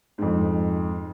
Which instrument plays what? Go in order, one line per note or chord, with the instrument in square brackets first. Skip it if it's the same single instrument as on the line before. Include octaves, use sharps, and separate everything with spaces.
[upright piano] F2 G#2